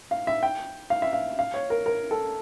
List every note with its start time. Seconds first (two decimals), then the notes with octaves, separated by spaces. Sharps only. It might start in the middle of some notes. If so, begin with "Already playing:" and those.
0.11 F5
0.27 E5
0.43 G5
0.90 F5
1.02 E5
1.13 F5
1.39 F5
1.54 C#5
1.70 A#4
1.86 A#4
2.11 A4